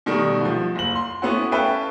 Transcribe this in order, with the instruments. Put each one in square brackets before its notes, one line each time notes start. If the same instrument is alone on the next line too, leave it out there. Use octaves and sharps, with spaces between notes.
[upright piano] B2 D#3 G3 A3
C2 F3
F#1 F#7
C6
A3 B3 C#4 E4 F#4
C#4 A4 B4 E5 F5 G5